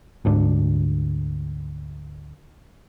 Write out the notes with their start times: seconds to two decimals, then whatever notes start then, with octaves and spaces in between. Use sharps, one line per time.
0.25 D2 G#2 D4